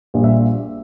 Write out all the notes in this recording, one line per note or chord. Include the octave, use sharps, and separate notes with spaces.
A#1 A#2 G3
E5